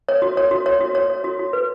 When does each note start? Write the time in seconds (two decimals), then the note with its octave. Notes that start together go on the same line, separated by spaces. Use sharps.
0.09 C#5
0.22 F#4
0.37 C#5
0.51 F#4
0.66 C#5
0.81 F#4
0.95 C#5
1.10 C#5
1.24 F#4
1.39 F#4
1.53 B4